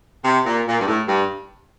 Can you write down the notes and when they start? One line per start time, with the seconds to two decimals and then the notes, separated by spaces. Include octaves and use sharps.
0.25 C3
0.46 A#2
0.67 A#2
0.80 G2
0.87 A2
1.07 G2